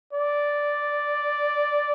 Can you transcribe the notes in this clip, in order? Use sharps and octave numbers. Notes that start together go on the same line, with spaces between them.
D5